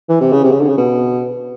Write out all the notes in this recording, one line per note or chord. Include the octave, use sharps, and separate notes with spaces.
E3
C3
C#3
C3
C#3
D3
C#3
B2